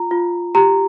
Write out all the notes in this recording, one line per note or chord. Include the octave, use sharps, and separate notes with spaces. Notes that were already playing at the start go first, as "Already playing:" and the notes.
Already playing: F4 A#5
F4
G4 A#5